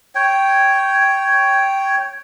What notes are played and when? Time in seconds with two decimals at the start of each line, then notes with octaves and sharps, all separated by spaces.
0.15 C#5 G5